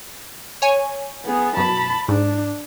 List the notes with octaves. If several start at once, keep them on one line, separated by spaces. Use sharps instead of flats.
C#5 G#5
B3 G#4
F#2 B2 A5 B5
G#2 D4